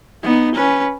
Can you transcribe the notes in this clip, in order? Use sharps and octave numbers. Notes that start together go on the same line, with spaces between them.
B3 D#4
C#4 B4